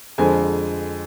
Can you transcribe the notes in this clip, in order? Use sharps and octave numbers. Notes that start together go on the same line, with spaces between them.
F2 D3 F3 G#3 G#5